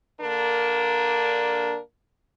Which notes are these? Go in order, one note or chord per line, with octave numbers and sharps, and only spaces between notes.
D3 A#3 D4 A#4